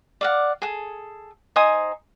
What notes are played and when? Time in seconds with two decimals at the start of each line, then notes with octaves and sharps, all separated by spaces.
0.21 D5 F5 F#5
0.62 G#4 A4
1.56 D#4 C5 G#5 D#6